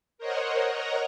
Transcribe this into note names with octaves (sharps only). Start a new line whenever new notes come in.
A#4 C5 C#5 D#5 F#5
A#4 C#5 D#5 F#5 A#5